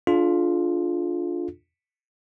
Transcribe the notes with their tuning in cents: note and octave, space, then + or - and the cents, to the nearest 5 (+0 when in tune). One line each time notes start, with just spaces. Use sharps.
D4 +0 F4 +0 A4 -45